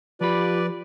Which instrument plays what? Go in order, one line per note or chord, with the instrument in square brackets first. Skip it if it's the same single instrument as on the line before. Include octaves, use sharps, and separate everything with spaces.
[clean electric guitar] F3 B5 [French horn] F4 [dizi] G4 [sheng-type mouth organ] B4 D5